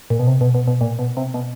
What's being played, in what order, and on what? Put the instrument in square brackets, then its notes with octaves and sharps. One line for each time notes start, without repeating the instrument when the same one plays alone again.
[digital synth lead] A#2
B2
C3
B2
B2
B2
A#2
B2
C3
B2